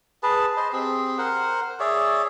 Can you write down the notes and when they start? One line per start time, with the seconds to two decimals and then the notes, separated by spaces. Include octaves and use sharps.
0.23 G#4 B4 A5
0.57 C5 D#5
0.73 C4 G4 G#4
1.18 A#4 C5 F#5
1.80 G#4 C#5 D5 E5